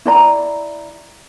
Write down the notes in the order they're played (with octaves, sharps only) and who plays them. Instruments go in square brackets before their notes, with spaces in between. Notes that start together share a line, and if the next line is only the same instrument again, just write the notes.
[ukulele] E4 D5 A#5